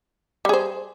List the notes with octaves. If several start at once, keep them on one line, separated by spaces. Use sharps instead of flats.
G3 G#4 C5